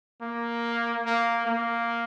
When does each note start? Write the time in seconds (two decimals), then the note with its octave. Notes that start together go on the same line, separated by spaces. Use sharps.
0.22 A#3
1.06 A#3
1.47 A#3